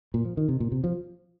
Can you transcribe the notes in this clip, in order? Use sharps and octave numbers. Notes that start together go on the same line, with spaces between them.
A#2
F3
D#3
C3
A#2
C3
F3